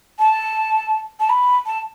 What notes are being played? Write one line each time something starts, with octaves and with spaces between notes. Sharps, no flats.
A5
A5
B5
A5